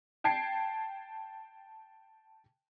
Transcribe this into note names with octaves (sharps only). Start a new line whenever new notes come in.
G5 A5 G#6 C7 D7